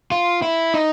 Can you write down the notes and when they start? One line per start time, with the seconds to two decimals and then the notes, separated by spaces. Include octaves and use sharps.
0.12 F4
0.42 E4
0.74 D#4